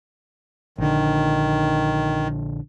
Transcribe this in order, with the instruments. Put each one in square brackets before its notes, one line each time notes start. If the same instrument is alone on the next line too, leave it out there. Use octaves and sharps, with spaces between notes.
[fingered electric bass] A#1 D3 [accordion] D#3